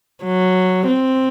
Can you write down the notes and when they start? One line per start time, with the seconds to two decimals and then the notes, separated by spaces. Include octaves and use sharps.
0.24 F#3
0.87 C4